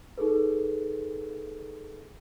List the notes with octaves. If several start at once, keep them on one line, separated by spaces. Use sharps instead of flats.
D#4 G#4 A4 B4